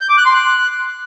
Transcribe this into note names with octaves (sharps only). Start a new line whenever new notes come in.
G6
D6
F#6
C6
F#6